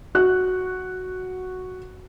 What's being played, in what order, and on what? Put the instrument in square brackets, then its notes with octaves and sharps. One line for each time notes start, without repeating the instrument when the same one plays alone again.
[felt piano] F#4 F#6